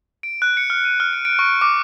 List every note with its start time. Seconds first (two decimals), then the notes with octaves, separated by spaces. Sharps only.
0.23 D7
0.42 F#6
0.57 C#7
0.70 F6
0.85 D#7
1.00 F6
1.13 D7
1.25 D7
1.39 C#6
1.61 D6